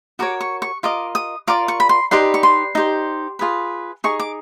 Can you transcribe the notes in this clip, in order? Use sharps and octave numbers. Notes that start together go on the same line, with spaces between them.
F#4 A#4 C#5 D6
C#6
C#6
F4 A#4 D#5 D6
D#6
F4 A#4 D5 D6
C#6
B5
C6
D#4 G4 B4 D5 C6
C#6
C6
D#4 G4 C5
F4 G#4 B4
D#4 G#4 C#6
D6